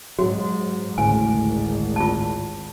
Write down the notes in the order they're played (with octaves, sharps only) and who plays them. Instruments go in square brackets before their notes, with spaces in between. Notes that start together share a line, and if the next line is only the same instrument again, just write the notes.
[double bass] G#2 [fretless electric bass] F#3 [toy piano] F#4
[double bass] G#1 [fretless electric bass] D2 A2 C#3 [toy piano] G#5
[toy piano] F4 A5